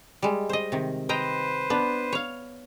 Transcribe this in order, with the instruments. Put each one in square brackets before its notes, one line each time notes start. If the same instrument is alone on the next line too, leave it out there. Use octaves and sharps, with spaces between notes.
[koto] G3 G#3
C5 D#5
C3 D#3
[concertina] B4 C5 [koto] D#5 G5 A#5
[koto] B3 D4
C#5 F5